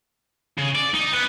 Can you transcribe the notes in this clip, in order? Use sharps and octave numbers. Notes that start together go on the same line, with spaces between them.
C#3
D5
D#4
B3